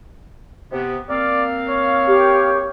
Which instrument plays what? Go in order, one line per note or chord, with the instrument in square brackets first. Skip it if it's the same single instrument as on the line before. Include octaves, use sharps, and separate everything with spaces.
[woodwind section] C3 B3
[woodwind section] A#3 C4 F5 [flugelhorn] D5
[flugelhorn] C#5
[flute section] G4